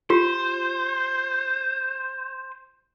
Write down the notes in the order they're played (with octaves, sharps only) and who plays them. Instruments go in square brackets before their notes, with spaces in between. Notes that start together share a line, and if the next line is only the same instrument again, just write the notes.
[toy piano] F4 G4 [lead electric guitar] C5